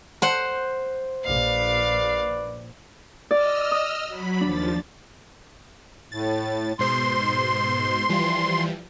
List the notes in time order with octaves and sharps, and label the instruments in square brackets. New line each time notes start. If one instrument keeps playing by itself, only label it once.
[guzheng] C5 F#5
[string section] A#1 [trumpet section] B4 D5 [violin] F5
[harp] D5 [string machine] D#5 E6 F6
[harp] D#6
[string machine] F#3 B5 B6
[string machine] D#2 F3 A6 [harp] D4
[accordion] A2 [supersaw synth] A6
[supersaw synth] G#2 B2 C5 [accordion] C6
[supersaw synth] E3 F3 G3